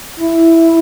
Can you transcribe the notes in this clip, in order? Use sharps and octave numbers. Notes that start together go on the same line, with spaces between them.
E4